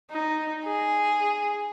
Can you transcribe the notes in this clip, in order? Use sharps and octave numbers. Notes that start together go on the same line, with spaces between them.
D#4
G#4